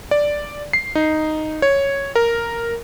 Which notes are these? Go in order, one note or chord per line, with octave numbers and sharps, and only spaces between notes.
D5
C7
D#4
C#5
A#4